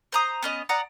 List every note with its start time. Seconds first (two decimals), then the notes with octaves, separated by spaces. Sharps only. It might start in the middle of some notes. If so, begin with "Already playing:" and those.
0.12 C5 A#5 D#6
0.43 B3 C#4 D#5
0.69 D5 F#5 A#5 D#6